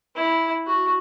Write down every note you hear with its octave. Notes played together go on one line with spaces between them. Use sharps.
E4
F#4